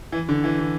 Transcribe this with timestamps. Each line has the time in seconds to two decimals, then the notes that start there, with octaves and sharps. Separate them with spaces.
0.12 E3
0.29 D3
0.44 E3
0.59 E3